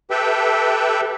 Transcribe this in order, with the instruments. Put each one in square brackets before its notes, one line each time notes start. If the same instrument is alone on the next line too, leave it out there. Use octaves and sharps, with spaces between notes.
[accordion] G4 A4 B4 E5 G5